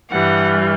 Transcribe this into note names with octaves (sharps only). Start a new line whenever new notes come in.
G2 E3 G3 F#5